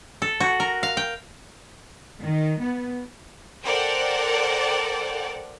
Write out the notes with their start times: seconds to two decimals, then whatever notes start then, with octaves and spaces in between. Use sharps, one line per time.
0.22 A4
0.40 F#4
0.60 A#4
0.83 F5
0.97 G5
2.22 D#3
2.61 B3
3.63 A4 A#4 C5 D5 F#5 G5